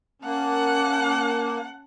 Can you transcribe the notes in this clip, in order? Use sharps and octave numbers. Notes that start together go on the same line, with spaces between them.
A#3 C#4 F#5 A5